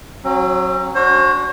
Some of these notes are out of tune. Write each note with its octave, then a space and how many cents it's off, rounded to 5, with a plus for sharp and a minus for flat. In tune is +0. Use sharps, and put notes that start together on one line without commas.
F#3 +0 C#4 -45
D4 -30 F#4 +0 C5 +40